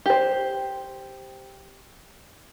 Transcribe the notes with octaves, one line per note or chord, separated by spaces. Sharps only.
G4 C5